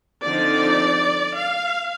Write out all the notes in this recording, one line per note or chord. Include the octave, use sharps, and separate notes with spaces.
D3 F3 C4 D#4 D5
F5